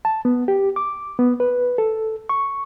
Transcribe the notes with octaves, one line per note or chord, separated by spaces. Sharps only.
A5
B3
G4
D6
B3
B4
A4
C#6